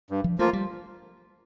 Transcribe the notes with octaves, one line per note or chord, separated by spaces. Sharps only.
G2
F3
F3 A3 A#3 F4
G3